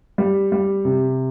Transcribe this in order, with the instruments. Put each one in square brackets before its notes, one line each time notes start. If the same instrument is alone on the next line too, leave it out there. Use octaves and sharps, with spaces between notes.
[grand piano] G3
G3
C3